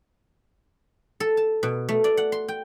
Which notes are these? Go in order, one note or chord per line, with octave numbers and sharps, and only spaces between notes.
A4
A5
B2
A3
D5
F#5
C6
G5